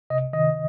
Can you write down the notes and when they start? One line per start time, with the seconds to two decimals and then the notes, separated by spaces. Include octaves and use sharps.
0.10 C3 D#5
0.33 D#3 D#5